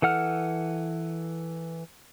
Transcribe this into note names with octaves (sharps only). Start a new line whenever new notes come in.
E3 A4 F#5 F6